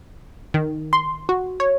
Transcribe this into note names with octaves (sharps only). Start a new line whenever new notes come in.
D#3
C6
F#4
C#5